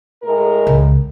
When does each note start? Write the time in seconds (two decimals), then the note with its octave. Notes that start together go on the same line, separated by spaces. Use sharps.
0.22 A2 G#3 A#4
0.67 C#2